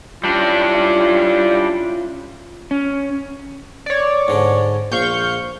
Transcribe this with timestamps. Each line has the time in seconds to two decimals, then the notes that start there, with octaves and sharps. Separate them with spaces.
0.24 G3 C#4 D4 E4 F4
2.71 C#4
3.86 C#5 D5
4.28 G#2 D3
4.92 A#1 F5 C#6 G6